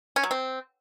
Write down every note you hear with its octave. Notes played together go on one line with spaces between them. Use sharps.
C#4
F#3
C4